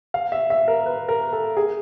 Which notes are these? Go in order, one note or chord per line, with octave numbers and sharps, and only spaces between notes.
F5
E5
E5
A#4
B4
A#4
A4
G#4